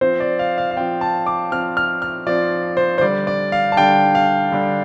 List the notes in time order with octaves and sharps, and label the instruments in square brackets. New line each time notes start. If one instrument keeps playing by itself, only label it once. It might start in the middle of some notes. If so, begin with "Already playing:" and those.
[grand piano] F3 C4 C5
D5
F5
F5
F5
F3 C4 G5
A5
D6
F3 C4 F6
F6
F6
F3 C4 D5
C5
C5
D3 G3 D4 D5
D5
F5
A5
D3 G3 D4 G5
F5
D3 G3 D4